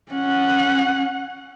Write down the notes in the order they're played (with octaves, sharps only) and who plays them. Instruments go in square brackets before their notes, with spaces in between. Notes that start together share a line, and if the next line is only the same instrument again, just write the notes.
[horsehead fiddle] C#4 F#5